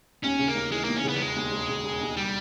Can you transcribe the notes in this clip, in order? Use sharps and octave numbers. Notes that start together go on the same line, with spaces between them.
D#2 C#4
C#3
A#3
D#2
E3 G#3
D#2 A#3
C#4
C#3 B3
G3
E1 G#3
D#2
E1
C#3
E1
D#2
G3